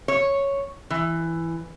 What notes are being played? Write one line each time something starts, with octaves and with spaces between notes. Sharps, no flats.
C#5
E3